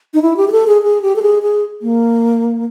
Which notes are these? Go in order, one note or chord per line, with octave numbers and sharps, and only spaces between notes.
D#4
E4
G4
G#4
A4
G#4
G#4
G4
A4
G#4
G#4
A#3